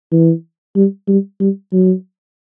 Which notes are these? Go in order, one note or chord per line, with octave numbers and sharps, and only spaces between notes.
E3
G3
G3
G3
F#3